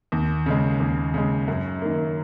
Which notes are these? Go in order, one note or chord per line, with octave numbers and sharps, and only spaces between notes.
D#2
C#3 G#3
D#2
C#3 G#3
F#2
D#3 A#3